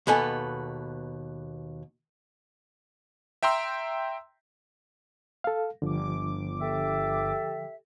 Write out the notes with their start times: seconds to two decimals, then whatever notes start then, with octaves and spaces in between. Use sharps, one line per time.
0.07 D#2 B2 B3 A4 G#5
3.43 E5 G5 A#5 C6 E6
5.44 A4 F5
5.82 G1 D3 F3 D6
6.61 G4 A4 E5